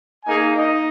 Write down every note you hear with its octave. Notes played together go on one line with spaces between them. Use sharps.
A#3 D#4 G#4 G#5
D#4 D#5